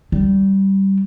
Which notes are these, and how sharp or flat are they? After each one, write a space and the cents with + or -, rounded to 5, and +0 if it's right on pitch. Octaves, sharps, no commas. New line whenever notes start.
G3 -10